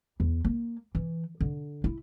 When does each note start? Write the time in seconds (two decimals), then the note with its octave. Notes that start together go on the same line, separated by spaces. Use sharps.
0.20 E2
0.45 A#3
0.95 E3
1.41 D3
1.84 E4